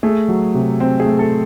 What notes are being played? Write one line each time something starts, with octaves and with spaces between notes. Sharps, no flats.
A3 G#4
F#3
C3
C4
G#4
A3
A4